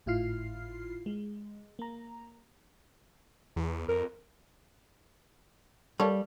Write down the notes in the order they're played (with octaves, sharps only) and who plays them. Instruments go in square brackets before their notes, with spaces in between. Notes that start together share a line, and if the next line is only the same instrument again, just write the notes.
[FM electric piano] G#1 A2 E4 F4 F6 C7
G#3
A#3 A#5
[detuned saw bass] E2
[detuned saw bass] F2 [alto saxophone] A#4
[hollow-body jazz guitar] G3 [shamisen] A#3 A4 C#5